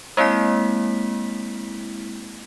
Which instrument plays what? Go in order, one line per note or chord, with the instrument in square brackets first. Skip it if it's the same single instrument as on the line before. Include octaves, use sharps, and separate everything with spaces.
[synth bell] G#3 A#3 C4 E4 B6